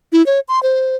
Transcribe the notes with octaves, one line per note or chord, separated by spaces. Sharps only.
E4
C#5
C6
C5